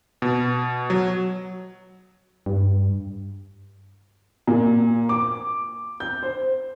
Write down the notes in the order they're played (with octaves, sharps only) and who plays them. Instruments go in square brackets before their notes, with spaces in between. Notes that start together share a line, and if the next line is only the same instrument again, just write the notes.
[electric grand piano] B2
F#3
[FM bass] G2
[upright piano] A#2
D6
G6
C5